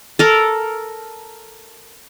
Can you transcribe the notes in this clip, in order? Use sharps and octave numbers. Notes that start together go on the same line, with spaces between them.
A4 A#4